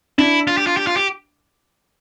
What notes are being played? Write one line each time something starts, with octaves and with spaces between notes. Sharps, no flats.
D4 E4
F4
G4
F4
G4
F4
G4